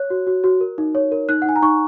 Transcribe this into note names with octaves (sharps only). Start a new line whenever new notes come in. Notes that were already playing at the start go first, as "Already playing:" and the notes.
Already playing: C#5 F#6
F#4
F#4
F#4
A#4
D#4
C#5
A#4
D#4 F#6
F#5
D#4 G#5
A#5
D#4 C#6